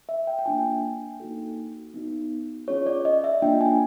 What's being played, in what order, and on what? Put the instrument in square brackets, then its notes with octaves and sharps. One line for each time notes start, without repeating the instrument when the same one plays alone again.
[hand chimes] E5
G5
G5
A#3 D4 F4 G#5
A#3 D#4 F#4 A4
B3 D#4 F#4
C#4 F4 G#4 C#5
D5
D#5
E5
A#3 D4 F4 G5
G#5